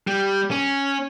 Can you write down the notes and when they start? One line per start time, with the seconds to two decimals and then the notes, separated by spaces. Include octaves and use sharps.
0.07 G3
0.51 C#4